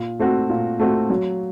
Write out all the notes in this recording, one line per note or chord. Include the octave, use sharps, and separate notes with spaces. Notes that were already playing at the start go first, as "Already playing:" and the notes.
Already playing: A#2
A3 C4 F#4
A#2
A3 C4 F#4
F#3